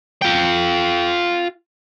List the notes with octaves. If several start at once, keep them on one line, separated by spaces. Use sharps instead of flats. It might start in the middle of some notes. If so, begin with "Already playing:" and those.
F4 G5